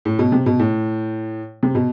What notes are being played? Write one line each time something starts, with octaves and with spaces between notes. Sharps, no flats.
A2
B2
C3
B2
A2
C3
B2